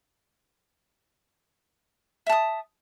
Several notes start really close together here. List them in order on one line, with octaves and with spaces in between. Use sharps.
E5 A5 D#6